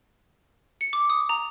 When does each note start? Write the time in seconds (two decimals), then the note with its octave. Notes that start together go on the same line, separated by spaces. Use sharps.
0.81 C#7
0.93 D6
1.10 D#6
1.29 A#5